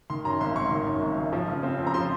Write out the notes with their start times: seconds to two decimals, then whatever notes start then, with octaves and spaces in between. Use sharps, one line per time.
0.10 D#3 C6
0.25 F#2 A#5
0.41 G#1 C6
0.56 G#1 C#6
0.71 D#3
0.87 F#2
1.02 G#1
1.17 G#1
1.33 F3
1.48 C#3
1.63 C4
1.79 F2
1.87 A#5
1.94 F3 C6